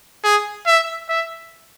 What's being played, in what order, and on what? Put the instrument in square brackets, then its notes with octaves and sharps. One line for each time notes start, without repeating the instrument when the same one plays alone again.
[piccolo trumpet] G#4
E5
E5